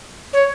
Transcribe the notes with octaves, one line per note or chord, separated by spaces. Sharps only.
C#5